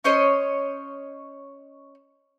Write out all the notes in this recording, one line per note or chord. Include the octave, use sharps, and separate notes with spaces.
C#4 C5 C#5 D#5